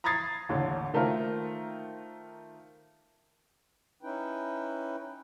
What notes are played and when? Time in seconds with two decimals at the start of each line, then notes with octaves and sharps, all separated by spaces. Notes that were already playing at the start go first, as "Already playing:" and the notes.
0.04 A#5 B5 D#6 G#6 A6 C7
0.49 A1 D#2 D3
0.94 D#3 A3 A#3 F4 A#4 C5
4.03 C#4 D#4 E4 B4 G5